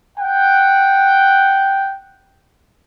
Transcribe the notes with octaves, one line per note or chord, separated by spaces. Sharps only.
F#5 G5